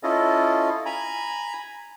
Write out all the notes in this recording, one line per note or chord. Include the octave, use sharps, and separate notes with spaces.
C#4 E4 F4 A4 D#5
G#5 A#5 B5